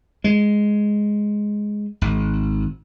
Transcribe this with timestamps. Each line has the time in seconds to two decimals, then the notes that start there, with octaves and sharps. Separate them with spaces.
0.24 G#3
2.01 G#1